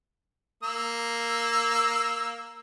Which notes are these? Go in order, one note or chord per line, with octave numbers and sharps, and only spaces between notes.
A#3 E6